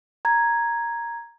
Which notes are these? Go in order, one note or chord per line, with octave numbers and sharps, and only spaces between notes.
A#5 G#6